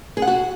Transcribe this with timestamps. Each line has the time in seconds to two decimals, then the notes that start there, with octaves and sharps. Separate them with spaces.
0.17 G#4
0.22 F#5
0.27 F#4